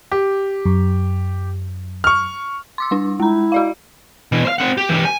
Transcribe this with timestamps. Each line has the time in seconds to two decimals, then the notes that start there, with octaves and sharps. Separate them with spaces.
0.12 G4
0.66 F#2
2.04 C#6 F6
2.78 C6 D6 E6
2.91 G3 D4
3.20 G#3 E4 A#5
3.52 F#4 D5 F5
4.32 B2 E3
4.45 C5 F5
4.58 C4 F#5
4.77 G4
4.89 E3 G4
5.05 G#5